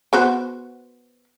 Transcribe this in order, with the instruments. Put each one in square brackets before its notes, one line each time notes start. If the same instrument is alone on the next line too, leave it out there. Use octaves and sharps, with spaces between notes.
[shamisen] B3 F#4 C5